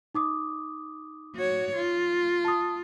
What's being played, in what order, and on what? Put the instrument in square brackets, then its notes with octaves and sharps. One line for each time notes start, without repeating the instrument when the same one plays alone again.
[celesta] D#4 D6 D#6
[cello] F#4 C#5
F4
[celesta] A5 D#6